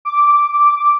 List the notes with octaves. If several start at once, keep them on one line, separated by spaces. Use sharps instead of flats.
D6